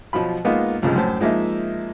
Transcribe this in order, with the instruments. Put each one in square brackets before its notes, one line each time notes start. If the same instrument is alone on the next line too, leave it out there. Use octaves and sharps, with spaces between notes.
[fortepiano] B2 F3 F#3 F4 B5
G#3 A#3 B3 D#4 F4
C2 C#3 F3 G3 G#3
F#2 A2 C5 A5
F3 G#3 A#3 D#4 E5